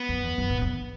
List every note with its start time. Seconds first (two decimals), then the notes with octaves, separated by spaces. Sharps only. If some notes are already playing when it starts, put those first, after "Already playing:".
Already playing: B3
0.09 F#2
0.23 E2
0.38 F#2
0.50 A2
0.61 E2